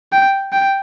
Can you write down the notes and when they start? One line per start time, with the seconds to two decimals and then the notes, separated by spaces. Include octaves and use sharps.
0.12 G5
0.53 G5